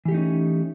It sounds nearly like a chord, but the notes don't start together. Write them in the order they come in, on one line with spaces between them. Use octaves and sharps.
E3 G4 A3 D#4 C#4